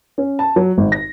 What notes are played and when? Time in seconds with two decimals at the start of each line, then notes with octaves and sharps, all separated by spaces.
0.18 C#4
0.39 A5
0.56 F#3
0.78 G#1
0.92 A#6